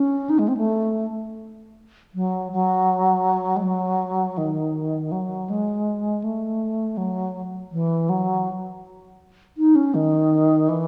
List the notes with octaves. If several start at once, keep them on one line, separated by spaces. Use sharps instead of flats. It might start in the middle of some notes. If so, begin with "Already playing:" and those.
Already playing: C#4
D#4
G#3
C4
A3
F#3
F#3
G#3
F#3
D#3
F#3
G#3
A3
F#3
E3
F#3
D#4
C#4
D#3
E3